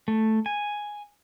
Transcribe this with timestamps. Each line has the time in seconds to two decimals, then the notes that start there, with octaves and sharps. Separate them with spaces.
0.08 A3
0.46 G#5